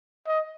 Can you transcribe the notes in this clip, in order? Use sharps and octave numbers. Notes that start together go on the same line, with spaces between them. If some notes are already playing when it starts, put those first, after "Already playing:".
D#5